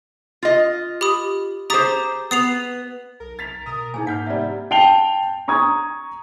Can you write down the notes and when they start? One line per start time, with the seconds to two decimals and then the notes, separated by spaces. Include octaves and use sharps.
0.43 F4 D#5
1.01 G4 B5 D#6
1.70 G4 G#4 C5 A#5 D#6 A6
2.31 B3 D#6 C7 F7
3.20 B1 A#4
3.39 A6 B6 F7
3.66 B2 A#4 D#6
3.94 A#2 A#3 D#4 G#4 G#5
4.07 G#2 F#5 F6 G6 B6
4.27 C3 G3 D5 E5
4.71 G5 A5 C7 F7 G7
5.48 A#5 C#6 D#6 G#6